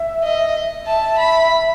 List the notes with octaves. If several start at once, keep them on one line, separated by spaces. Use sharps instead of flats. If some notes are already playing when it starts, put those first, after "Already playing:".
Already playing: E5
D#5
E5 A5
B5